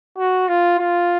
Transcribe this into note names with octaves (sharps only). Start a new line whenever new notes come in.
F#4
F4
F4